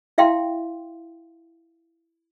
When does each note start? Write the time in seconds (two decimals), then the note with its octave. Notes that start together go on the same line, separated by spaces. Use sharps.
0.18 E4 E5 F5 G5 C6